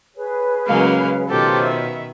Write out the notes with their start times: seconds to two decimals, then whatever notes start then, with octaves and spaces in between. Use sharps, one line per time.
0.15 G#4 B4 C#5
0.67 C#3 F#3 G#3 A#3 F5
1.29 B2 D#3 F4 G4 A4 C5 C#5
1.63 E5